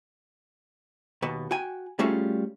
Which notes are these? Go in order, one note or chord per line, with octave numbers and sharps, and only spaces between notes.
D#2 B2 B3
F#4 G5 G#5
G3 A3 C#4 F4 F#4 G#4